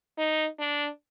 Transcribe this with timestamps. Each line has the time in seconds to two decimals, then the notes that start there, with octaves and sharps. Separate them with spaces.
0.18 D#4
0.59 D4